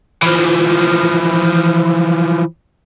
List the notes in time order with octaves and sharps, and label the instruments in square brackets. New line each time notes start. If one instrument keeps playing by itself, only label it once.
[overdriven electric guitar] E3 F3